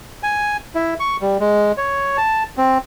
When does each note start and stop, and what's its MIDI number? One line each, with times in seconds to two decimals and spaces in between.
0.23 0.57 80
0.75 0.94 64
1.00 1.17 85
1.21 1.37 55
1.40 1.72 56
1.78 2.17 73
2.17 2.43 81
2.57 2.78 60